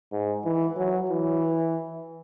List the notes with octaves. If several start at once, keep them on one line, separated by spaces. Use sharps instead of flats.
G#2
E3
F#3
E3